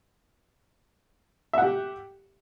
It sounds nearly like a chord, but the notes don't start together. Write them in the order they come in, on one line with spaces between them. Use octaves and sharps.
E5 F#5 G4